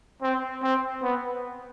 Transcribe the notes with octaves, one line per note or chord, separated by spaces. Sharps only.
C4
C4
B3